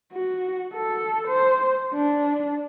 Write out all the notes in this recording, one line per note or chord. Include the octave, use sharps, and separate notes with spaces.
F#4
A4
C5
D4